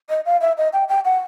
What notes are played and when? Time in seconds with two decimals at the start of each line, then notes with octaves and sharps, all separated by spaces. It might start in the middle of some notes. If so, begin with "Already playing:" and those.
0.10 D#5
0.26 F5
0.41 E5
0.58 D#5
0.73 G5
0.89 G5
1.05 F#5